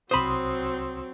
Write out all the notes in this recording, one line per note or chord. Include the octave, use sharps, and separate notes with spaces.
C2 F#3 C4 C5 B5 C6 D#6